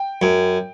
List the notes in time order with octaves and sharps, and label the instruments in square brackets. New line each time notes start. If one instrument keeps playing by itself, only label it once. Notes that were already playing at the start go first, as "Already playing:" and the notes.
Already playing: [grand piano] G5
[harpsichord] F#2